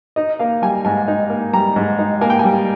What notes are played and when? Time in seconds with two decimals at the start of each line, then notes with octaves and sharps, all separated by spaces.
0.16 D#4 D#5
0.39 A#3 F5
0.62 G3 G#5
0.85 G#2 G#5
1.08 D#4
1.30 A#3
1.53 G3 A#5
1.76 G#2
1.99 D#4
2.21 A#3 G#5
2.30 G5
2.39 G3 G#5